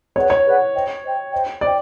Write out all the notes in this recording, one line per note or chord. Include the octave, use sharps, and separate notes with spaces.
G#4 B4 C#5 D5 F#5
C#5
G#4 B4 D5 F#5
C5 D#5 G5
C5 D#5 G5
C5 D#5 G5
C5 D5 D#5 G5